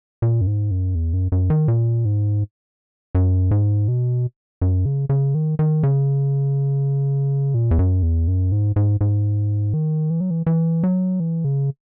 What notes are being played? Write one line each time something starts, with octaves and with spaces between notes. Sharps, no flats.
A#2
F#2
G#2
F#2
E2
F#2
F#2
D#3
A#2
G#2
F#2
G#2
B2
F#2
C#3
C#3
D#3
D#3
C#3
A#2
E2
F#2
E2
F#2
G#2
G#2
G#2
D#3
E3
F#3
E3
E3
F#3
E3
C#3